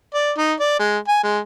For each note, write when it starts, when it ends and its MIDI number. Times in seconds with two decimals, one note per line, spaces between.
0.14 0.32 74
0.38 0.54 63
0.60 0.77 74
0.79 0.98 56
1.08 1.18 80
1.23 1.39 56